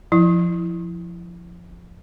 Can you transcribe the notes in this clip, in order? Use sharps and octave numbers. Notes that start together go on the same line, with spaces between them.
F3 E4